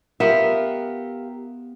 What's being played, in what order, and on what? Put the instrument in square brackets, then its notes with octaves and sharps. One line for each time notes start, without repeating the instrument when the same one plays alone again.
[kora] B3 E5 [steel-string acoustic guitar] F4 G4 A#4